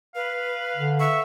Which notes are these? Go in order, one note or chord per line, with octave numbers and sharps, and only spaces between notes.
B4 F5
D3
E5 C#6